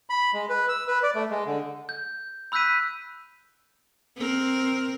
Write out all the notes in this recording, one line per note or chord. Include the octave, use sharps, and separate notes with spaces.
B5
G#3
B4
E6
B4
D5
A3
G#3
D3
G6
B5 E6 F#6 G6 B6 D#7
C4 A#4